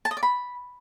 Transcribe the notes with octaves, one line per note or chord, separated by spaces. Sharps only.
A5
D#5
D5
B5